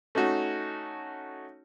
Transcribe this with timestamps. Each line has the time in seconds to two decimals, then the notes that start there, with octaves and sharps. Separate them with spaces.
0.15 A3 C#4 D#4 F#4